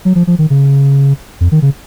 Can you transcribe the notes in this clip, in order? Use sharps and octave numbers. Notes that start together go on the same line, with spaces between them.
F#3
F3
F3
D#3
C#3
F2
D#3
C#3